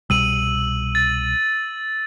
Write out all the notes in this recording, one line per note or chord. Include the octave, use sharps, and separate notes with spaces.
C2 B2 G3 E6 D#7 F#7
A6